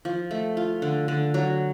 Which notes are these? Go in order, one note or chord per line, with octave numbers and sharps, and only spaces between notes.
F3
A3
F4
D3
D3
F#3